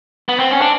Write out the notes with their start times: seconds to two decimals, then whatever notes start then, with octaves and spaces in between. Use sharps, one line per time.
0.29 B3
0.40 C4
0.51 C#4
0.61 D4